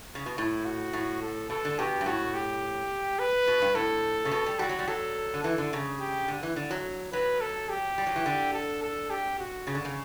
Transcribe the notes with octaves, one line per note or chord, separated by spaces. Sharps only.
C#3
B2
A2 E4
F#4
A2
A4
B2 A4
D3
B2 G4
G2
A2 F#4
G4
B4
B2
G2
A2 A4
C#3
B2
G3
G3 F#4
F#3
G3
F#3 A4
D3
E3 A4
D3
C#3
G4
D3
E3
D3
F#3
F#3 B4
A4
G4
G3
F#3
E3
D3
A4
A4
G4
F#4
C#3
D3
C#3